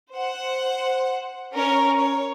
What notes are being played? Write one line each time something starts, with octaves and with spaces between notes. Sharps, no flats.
C5 F#5
C#4 A#4 C#5
C#5